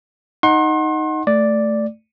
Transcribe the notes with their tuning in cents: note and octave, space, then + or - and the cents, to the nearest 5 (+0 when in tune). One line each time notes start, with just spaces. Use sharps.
D#4 +0 F#5 +0 C6 +35
A3 +0 D5 +0